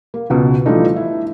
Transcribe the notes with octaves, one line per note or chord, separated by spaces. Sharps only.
A#3
C#2 B2
E3 F3 G3 A3 D4 D#4
E4